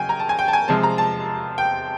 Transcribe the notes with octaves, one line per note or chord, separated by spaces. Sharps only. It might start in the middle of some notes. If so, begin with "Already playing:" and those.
Already playing: C#3 F#3 G5 G#5
A#5
A5
G#5
G5
A5
G#5
C3 F3 G#3 C4 A5
A#5
A5
G5